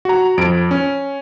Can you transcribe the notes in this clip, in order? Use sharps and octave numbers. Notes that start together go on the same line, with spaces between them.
F#4 A#5
F2 D7
C#4